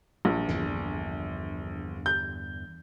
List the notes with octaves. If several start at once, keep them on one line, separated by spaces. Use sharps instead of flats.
A#1
E2 G2 D3
G6